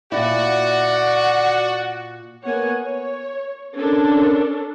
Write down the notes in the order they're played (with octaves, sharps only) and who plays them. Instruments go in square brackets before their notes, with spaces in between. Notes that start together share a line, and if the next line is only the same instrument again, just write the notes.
[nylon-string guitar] A#2 E4 [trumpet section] F#4 [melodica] D5 [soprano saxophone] F#5
[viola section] A#3 B3 C#5 F#5 G#5
C#5
C#4 D4 A4 A#4